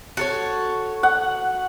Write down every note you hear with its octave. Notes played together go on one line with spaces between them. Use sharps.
F#4 A4 C#5
F#5